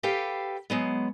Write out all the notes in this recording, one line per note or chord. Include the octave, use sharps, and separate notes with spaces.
G4 A4 B4 F5 G5
F#3 G#3 B3